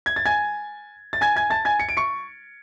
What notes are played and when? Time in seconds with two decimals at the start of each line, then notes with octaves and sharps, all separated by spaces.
0.06 G#6
0.16 A6
0.26 G#5 G#6
1.13 A6
1.21 G#5 G#6
1.36 G#5 G#6
1.50 A5 A6
1.65 G#5 G#6
1.80 C#7
1.89 D7
1.97 C#6 C#7